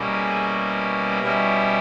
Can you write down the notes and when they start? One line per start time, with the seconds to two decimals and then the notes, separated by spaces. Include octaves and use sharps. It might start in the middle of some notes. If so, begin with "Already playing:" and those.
Already playing: B2 G3 A#3 C#4 E4
0.11 G#4
1.21 B2 G3 C#4 E4 A#4